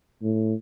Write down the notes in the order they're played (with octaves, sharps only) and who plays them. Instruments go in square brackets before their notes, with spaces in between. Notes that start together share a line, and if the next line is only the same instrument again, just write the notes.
[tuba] A2